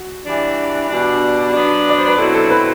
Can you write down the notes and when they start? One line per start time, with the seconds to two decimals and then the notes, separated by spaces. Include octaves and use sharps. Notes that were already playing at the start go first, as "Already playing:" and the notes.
Already playing: F#4
0.24 E3 G3 D4
0.89 B2 G3 D4
1.54 F#3 B3 D4
1.89 D5
1.98 C5
2.08 B4
2.18 B2 F#3 C4 E4 A4
2.35 A4
2.50 B4